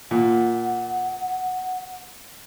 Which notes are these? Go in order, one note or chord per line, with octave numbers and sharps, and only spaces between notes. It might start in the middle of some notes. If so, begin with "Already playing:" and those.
A#2 F#5